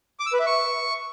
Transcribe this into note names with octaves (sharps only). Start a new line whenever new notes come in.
D6
E6
B4
E5
C#6